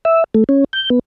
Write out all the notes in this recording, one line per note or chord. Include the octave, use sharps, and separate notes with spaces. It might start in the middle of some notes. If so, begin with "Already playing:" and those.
E5
A3
C#4
G6
B3